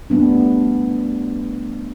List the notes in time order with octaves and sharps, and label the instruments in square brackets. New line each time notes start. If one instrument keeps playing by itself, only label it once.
[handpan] G3 A3 B3 D4